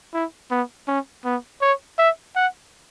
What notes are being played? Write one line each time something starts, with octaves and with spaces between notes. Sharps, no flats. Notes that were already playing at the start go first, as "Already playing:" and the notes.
E4
B3
C#4
B3
C#5
E5
F#5